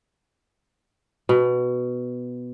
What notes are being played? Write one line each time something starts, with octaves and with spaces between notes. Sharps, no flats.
B2